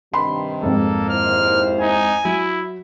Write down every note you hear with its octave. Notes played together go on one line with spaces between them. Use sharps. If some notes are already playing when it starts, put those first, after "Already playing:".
G2 C3 D#3 B5 C6
F2 G#2 A#3 A4
D#2 E4 C5 F6
D#4 G#5
F#3 E4